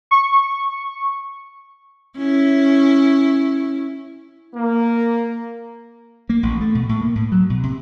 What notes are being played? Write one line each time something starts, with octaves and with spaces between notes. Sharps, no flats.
C#6
C#4 E4
A#3
A#3
A1
A3
B2
A2
A#3
A2
F#3
B2
C3